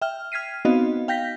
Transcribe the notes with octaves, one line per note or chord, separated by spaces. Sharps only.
E5 G5 F6
F6 G#6 B6 C7 D#7
B3 C4 D#4 F#4 D#5 F5
F5 G5 G6 A#6 B6